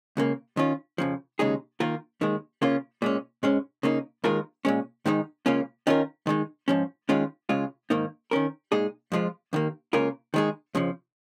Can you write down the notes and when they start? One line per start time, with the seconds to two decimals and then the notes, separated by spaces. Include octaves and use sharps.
0.17 C#2 C#3 A#3
0.57 D#3 C#4 F4
0.98 F2 C#3 F3
1.39 D#2 C#3 G#3 D#4 G#4
1.80 D#3 A#3 F4 A#4
2.21 D#2 D#3 G#3
2.62 C#3 A#3 C#4 F4
3.02 A#2 G#3 C#4
3.43 G#2 G#3 C#4
3.83 C#3 A#3 D#4
4.24 D#2 D#3 G#3 F4 A#4
4.65 A#2 G#3 C#4
5.05 G#2 D#3 G#3 D#4
5.46 C#2 C#3 A#3 C#4 F4
5.87 D#3 C#4 F4 A#4
6.27 D#3 G#3 D#4
6.68 G#2 F3 C#4
7.09 D#3 G#3 C#4 F4
7.49 C#2 C#3 G#3 F4
7.90 G#2 D#3 A#3 D#4
8.31 D#3 C#4 A#4
8.72 A#2 G#3 D#4 G#4
9.12 F2 F3 G#3 F4
9.53 D#2 D#3 A#3
9.93 C#2 C#3 A#3 F4 A#4
10.34 D#3 G#3 D#4 G#4
10.75 F2 C#3 F3